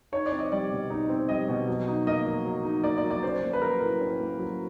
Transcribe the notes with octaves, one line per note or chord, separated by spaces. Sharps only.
D#4 C#5
D5
C4
D#5
G3 D5
B2
D#4
C4
G3 D#5
B2
F#3
D#4
A#3 D#5
F#3
F#3
D#4
A#3 D5
D5
F#3
D5
C#4 C5
A#3
B4
F#3 A#4
A2
C#4
A#3
F#3